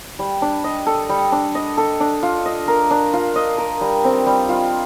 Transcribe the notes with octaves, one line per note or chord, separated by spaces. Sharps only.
G3
D4
D#5
A4
G3
D4
D#5
A4
D4
F4
D#5
A#4
D4
F4
D#5
A#4
G3
C4
G3
F4